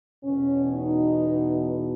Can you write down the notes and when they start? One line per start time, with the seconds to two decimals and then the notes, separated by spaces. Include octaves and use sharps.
0.23 E2 B2 C#4
0.72 D#4